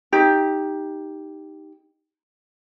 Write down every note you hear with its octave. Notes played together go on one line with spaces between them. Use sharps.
D#4 G4